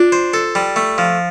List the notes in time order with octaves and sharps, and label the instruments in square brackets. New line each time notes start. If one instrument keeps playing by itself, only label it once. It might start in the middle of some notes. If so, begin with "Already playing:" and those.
Already playing: [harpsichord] D4 [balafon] F4
[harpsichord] C5
A4
G3
A3
F3